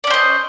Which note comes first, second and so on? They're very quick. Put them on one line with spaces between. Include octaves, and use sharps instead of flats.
D5 C#4 C5 D#5